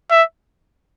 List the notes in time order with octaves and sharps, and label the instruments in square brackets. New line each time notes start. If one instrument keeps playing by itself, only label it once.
[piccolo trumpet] E5